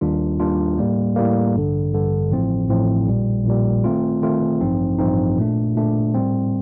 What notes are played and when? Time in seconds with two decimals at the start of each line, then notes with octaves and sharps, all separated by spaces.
0.01 D#2 D#3 G3 D4 F4
0.40 D#2 D#3 G3 D4 F4
0.78 A2 G3 A#3
1.16 A2 G3 A#3
1.55 A1 G2 D3
1.92 A1 G2 D3
2.31 A1 A2 F3 C4
2.69 A1 A2 F3 C4
3.07 A#1 A#2 G3
3.45 A#1 A#2 G3
3.84 D#3 A3 C4 F4
4.22 D#3 A3 C4 F4
4.61 A1 G2 F3 C4 D#4
4.99 A1 G2 F3 C4 D#4
5.38 A#2 A3 D4
5.75 A#2 A3 D4
6.14 A2 G3 C4